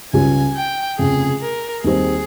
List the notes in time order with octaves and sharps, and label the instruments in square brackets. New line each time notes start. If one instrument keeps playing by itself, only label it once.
[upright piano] C#2 C#3 G3 C#4 F4 [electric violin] G#5
[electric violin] G5
[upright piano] F1 F2 C#3 [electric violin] G#4
[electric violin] A#4
[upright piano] D#2 D#3 G3 C4 [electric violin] G#4